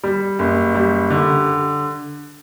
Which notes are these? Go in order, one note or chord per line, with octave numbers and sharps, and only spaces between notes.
G3
F#1
G3
D3